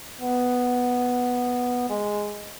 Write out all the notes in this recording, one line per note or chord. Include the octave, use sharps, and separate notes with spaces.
B3
G#3